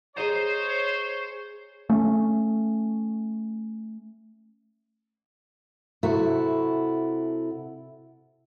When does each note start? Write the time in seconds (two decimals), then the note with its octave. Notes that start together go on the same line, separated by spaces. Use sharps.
0.16 G#4 C5 C#5 D#5 A#5
1.89 A3 C#4
6.03 C3 E4 F#4 A4